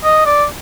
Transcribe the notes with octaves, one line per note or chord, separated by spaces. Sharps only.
D#5
D5